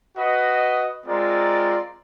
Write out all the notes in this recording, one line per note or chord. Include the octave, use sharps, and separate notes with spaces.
F#4 B4 D#5
G#3 C4 F4 A#4 D5